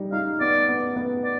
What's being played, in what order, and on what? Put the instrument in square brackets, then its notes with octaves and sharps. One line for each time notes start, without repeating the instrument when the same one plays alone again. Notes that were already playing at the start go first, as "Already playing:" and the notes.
Already playing: [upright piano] G3 D#4
[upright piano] D#4 [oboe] F5
[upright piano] B3 [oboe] D5
[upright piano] B3
B3
[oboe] D5